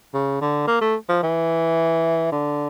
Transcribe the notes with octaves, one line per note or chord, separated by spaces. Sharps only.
C#3
D3
A#3
A3
F3
E3
D3